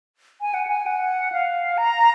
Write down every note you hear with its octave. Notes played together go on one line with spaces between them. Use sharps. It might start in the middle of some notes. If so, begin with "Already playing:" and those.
G#5
F#5
G#5
F#5
F5
A#5